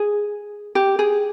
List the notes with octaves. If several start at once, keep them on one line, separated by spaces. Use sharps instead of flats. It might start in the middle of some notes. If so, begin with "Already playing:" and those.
Already playing: G#4
G4
G#4